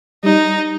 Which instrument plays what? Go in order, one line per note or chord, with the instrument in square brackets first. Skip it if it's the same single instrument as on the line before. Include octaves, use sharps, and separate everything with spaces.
[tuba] G3 [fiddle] D#4